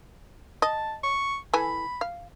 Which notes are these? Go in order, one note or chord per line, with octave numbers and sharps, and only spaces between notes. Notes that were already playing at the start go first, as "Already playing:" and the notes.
D#5 A5
C#6
E3 A4 G#5 B5
F5